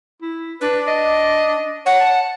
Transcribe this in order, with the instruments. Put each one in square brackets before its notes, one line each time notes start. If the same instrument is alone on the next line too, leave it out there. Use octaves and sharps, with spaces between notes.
[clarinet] E4
[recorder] D4 [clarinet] B4
[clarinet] D#5
[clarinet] C#5 [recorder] F#5
[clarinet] A5